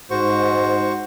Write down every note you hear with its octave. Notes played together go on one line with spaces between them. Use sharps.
G#2 F#4 C5 C#6